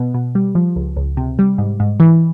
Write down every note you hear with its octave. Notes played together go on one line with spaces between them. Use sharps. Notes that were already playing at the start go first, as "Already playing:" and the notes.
Already playing: B2 B3
B2
G3
F3
C#2
C#2
C3
G3
G#2
G#2
E3